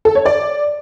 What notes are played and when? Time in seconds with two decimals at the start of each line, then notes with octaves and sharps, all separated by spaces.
0.05 A4
0.15 C#5
0.25 D5